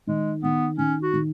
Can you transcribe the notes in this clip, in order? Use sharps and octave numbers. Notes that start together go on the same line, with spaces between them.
D#3 G#3
D#3 B3
D#3 C#4
F#4
D#3